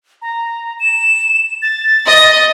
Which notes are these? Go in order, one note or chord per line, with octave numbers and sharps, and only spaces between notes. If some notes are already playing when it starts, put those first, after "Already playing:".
A#5
E7
A6
D#5